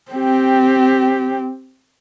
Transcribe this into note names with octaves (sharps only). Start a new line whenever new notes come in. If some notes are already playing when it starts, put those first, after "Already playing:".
C4 G4